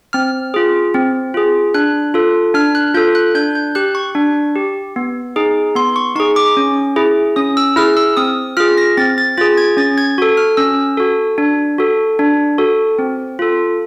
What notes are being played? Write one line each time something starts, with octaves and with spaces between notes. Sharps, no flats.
C4 F6
F4 G#4
C4
F4 G#4
D4 F#6
F4 A4
D4 F6
F#6
F4 A4 G6
F#6
D4 G6
G6
G4 F#6
C#6
D4
G4
B3
D#4 G#4
B3 C6
C#6
D#4 G#4 C#6
D6
C#4
E4 G#4
C#4 D#6
E6
E4 G#4 F6
E6
C4 D#6
F4 G#4 F6
A#6
C4 A6
A6
F4 G#4 A6
G#6
C#4 A6
G#6
F#4 A4
F6
C#4 E6
F#4 A4
D4
F#4 A4
D4
F#4 A4
C4
F4 A4